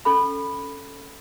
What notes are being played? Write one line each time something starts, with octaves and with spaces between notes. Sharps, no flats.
C#4 A4 B5